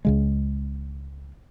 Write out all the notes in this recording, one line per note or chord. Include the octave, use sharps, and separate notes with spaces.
C#2 C#3 G#3